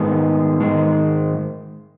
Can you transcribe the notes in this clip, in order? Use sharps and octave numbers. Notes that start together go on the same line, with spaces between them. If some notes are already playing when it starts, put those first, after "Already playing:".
Already playing: G#2 D#3 G#3 B3
G#2 D#3 G#3